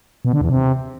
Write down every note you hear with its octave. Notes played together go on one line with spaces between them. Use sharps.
B2
D3
E2
C3